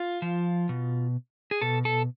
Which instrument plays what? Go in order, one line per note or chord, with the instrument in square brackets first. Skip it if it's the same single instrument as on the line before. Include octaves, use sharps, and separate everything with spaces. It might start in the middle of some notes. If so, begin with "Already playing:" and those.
Already playing: [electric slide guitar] F4
F3
B2
G#4
B2 A4
A4